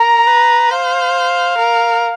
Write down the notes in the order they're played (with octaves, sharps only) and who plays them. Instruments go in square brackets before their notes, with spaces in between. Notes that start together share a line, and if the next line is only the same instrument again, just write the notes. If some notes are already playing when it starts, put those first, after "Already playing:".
Already playing: [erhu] A#4 [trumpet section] A#5
[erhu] B4
[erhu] C5 [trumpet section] F5
[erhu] A#4